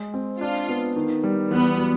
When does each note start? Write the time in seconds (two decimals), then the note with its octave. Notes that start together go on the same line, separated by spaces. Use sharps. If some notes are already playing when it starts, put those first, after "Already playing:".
Already playing: G#3
0.14 C4
0.40 D4 F4
0.69 B3
0.96 D#3
1.23 G3
1.50 E2 B3
1.77 F#3